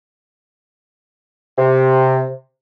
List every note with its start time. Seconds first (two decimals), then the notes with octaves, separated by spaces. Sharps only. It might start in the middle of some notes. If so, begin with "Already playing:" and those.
1.58 C3